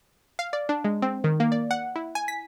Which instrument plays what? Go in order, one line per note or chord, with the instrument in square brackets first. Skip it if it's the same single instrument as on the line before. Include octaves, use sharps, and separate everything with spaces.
[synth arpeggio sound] F5
D5
D4
G#3
C4
D#3
A#3
D5
F#5
E4
G#5
B6